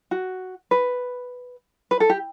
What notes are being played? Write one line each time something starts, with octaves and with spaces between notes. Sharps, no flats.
F#4
B4
B4
A4
G4